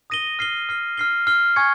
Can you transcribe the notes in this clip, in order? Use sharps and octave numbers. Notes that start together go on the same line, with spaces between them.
D#6 A#6 D#7 G7
F6 C7 G7
F6 C7 G7
F6 C7 G7
F6 C7 G7
G#5 C#6 G#6 C#7